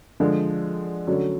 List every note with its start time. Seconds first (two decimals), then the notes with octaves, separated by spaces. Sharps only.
0.20 D3 F3 G#3
1.07 D3 F#3 A3 C#4 F#4